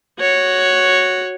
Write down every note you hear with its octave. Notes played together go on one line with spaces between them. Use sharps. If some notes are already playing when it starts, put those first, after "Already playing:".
F#4 C#5